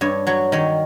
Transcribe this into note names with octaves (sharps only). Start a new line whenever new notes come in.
G2 C#5
F#3 C#5
D#3 C#5